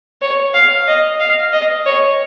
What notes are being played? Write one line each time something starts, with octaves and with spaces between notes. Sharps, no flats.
C#5
F5
D#5
F5
D#5
C#5